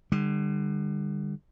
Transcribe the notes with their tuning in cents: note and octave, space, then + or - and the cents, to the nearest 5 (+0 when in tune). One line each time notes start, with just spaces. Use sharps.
D3 +35 G3 +30